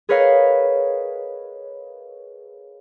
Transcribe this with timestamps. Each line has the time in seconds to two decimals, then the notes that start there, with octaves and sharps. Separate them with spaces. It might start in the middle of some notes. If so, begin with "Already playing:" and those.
0.09 G#4 A#4 B4 C#5 D#5 F5